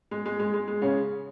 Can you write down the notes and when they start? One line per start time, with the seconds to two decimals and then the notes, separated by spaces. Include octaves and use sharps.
0.11 G#3
0.26 G#3
0.39 G#3
0.54 G#3
0.68 G#3
0.82 C#3 C#4